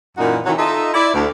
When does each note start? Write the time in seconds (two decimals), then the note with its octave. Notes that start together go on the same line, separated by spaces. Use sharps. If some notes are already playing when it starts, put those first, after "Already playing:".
0.18 F#2 A#2 E3 D#4 F#4
0.45 C3 D#3 E3 F#3
0.58 D#4 F4 A4 D#5 E5
0.94 E4 D5
1.14 D2